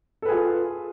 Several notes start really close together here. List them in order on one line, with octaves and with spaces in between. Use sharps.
A4 B4 G#4 F4